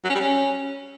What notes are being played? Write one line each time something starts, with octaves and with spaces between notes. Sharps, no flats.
F#3
C#4
G3
C#4